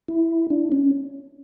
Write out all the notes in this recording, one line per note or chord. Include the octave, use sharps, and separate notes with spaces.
E4
D4
C#4